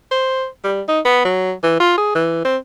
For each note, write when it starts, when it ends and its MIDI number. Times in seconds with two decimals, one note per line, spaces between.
0.11 0.47 72
0.64 0.81 55
0.88 1.00 63
1.05 1.23 59
1.25 1.53 54
1.63 1.76 52
1.80 1.95 65
1.98 2.12 68
2.15 2.41 52
2.45 2.57 60